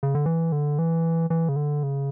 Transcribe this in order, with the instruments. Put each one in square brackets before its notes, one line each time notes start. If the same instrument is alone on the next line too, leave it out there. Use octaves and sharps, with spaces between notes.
[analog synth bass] C#3
D3
E3
D3
E3
E3
C#3
D3
C#3